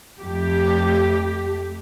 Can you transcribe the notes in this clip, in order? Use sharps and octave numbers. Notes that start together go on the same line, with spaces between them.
F2 A3 G4